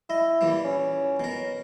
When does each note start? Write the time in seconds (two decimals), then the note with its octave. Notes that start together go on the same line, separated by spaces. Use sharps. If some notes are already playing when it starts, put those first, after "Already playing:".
0.10 E4 D#5
0.41 A#2 E3 G3
0.64 C#4
1.20 B2 A#4